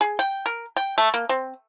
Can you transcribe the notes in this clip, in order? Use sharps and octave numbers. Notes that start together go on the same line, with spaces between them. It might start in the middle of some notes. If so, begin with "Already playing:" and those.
G#4
G5
A#4
G5
A3
A#3
C4